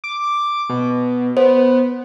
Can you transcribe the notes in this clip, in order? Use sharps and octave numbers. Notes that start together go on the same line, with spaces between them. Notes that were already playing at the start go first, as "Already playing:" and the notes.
D6
B2
B3 C5